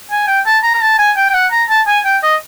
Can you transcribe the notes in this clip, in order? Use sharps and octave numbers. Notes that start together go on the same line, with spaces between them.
G#5
G5
A5
A#5
A#5
A5
G#5
G5
G5
F#5
A#5
A5
G#5
G5
D#5